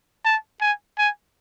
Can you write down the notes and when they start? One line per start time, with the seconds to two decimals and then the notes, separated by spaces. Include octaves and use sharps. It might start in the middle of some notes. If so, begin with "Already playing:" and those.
0.25 A5
0.61 G#5
0.98 G#5